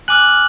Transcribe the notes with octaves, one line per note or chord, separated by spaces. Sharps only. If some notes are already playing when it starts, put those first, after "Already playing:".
G#5 D6 F6 F#6 F#7